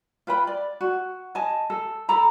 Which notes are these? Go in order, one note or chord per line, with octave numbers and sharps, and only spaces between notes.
F4 B4 G5 B5
D5
F#4
D#5 G#5 A5
A4
A4 G5 A#5 B5